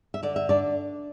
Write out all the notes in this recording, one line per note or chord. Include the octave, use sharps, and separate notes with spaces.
E5
D3 D5
E5
D4 D5